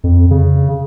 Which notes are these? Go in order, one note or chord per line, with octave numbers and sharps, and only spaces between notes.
F2
C#3